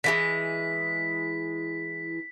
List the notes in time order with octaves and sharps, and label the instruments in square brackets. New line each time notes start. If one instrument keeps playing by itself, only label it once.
[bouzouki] D3 E3 G#3 [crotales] B6